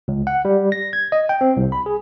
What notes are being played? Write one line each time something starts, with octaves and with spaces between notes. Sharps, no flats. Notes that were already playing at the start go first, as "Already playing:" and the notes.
C#2
F#5
G3
A#6
G#6
D#5
G5
C4
C2
B5
G#4